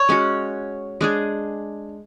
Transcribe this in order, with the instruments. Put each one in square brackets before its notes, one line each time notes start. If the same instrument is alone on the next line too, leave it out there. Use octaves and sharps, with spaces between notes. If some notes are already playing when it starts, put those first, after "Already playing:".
Already playing: [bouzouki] C#5
[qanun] G#3 C#4 F#4
G#3 D4 G#4